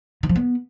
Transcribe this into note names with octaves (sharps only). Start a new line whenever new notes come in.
D#3
F3
B3